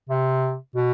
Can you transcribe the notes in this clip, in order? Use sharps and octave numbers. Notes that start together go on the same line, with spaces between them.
C3
B2